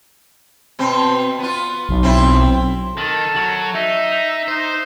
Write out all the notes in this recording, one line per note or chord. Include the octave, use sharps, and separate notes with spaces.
B2 C4
B3 F4
B1
C4 E4 F4
D#3 A4
F#3
D#4 E5
D#4 C5